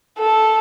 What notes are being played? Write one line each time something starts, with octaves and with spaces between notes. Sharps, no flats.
A4